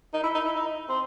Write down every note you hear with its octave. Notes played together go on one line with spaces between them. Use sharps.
D#4
E4
D#4
E4
D#4
C4